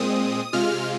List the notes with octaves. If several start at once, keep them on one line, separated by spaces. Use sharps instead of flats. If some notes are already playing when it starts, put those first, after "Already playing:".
Already playing: A#2 G#3 C4 D#6
C3 G#3 F4 F6